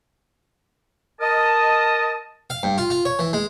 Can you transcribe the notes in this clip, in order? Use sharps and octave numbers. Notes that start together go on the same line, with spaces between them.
A#4 D#5 A5
F5
G2
F4
F4
C#5
E3
G#3